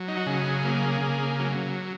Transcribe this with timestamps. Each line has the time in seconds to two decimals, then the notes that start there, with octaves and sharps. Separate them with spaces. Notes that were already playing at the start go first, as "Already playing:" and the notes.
Already playing: F#3
0.08 D#4
0.17 F#4
0.26 C#3 G#4
0.64 A#3
1.01 C#3
1.39 F#3